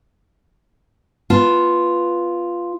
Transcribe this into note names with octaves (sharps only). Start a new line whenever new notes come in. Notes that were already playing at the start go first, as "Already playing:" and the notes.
B3 F4 A5